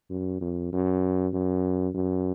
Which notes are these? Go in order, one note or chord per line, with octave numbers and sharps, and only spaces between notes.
F#2
F2
F#2
F#2
F#2